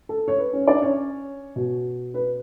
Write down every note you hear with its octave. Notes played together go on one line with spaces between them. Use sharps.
A4
C#5
B4
C#4 C#5
D4 D5
C#4 C#5
B2
B4